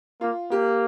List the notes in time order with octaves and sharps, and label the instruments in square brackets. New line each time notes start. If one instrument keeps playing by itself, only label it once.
[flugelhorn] A#3 [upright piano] F4
[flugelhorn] A#3 [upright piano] G4